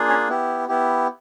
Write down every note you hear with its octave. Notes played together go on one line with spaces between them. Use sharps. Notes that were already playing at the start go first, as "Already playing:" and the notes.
Already playing: A#3 D4 F4 G#4
C#4 C#5
B3 E4 G4
B3 E4 G4